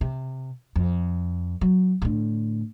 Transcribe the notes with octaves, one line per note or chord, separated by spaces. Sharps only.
C3
F2
F#3
A2 D3